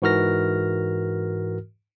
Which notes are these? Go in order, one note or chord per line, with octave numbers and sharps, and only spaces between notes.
G#2 E3 F#4 A#4 F6 A#6